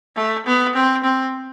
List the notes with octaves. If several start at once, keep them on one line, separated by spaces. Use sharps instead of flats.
A3
B3
C4
C4